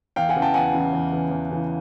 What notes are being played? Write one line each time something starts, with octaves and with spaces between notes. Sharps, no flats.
E2 F5 G5
F#5 G#5
C#3 E3
G5 A5
E2 F#5 G#5
C#3 E3
E2
C#3 E3
E2
C#3 E3